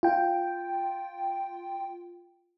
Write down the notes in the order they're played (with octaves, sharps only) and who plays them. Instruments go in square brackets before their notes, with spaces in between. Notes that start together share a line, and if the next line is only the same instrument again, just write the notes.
[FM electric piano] F4 G5